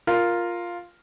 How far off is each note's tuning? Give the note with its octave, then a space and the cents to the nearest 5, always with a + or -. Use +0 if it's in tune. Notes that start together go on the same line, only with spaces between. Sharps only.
F4 +0 A#4 +0